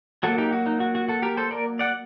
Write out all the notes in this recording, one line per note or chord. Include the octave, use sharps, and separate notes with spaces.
F#3 A#3 F#4 A4
D#4 G4
F#4
D#4
F#4
F#4
F#4 A4
G4 A#4
A4 C5
A#4 D5
D5 F#5